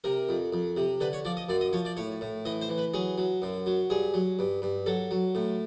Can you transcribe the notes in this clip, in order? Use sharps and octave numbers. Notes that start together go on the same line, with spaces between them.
C3 A#4
F2
F2
C3
D3 B4
C#5
F3 D5
D#5
F#2 D5
D#5
F3 C#5
D5
A2 C#5
A2
E3 D#5
C5
E3
B4
F#3 G#4
F#3
F#2
F#3
G2 G#4
F#3
G2
G2
F#3 A4
F#3
A2